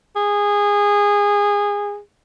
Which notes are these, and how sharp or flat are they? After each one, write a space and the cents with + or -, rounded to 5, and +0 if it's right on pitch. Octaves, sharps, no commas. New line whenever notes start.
G#4 -20